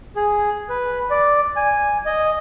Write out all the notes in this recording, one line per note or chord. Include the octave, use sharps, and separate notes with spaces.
G#4
B4
D5
G#5
D#5